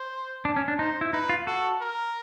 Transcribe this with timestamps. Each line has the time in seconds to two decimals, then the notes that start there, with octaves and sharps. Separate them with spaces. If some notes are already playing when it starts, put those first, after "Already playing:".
Already playing: C5
0.45 D4
0.56 C#4
0.68 D4
0.79 D#4 C5
1.01 E4
1.13 D#4 B4
1.29 F4
1.47 F#4 A4
1.81 A#4